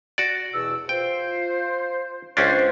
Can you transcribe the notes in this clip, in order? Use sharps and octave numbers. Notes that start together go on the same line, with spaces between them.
F#4 D5
E2 B2 E6
F4 C5 G5
C#2 C#4 D4 C5